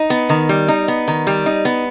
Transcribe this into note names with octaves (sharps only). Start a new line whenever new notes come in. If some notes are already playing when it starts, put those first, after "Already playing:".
Already playing: D#4
B3
D#3
G3
D#4
B3
D#3
G3
D#4
B3